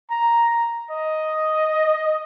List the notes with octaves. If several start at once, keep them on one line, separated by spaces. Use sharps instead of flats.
A#5
D#5